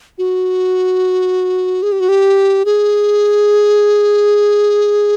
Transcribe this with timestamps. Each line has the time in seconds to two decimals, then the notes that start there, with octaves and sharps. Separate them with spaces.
0.18 F#4
1.83 G#4
1.92 G4
2.00 F#4
2.09 G4
2.65 G#4